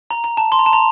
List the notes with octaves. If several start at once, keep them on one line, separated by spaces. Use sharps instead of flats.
A#5
A#5
A5
C6
A#5
A5
A#5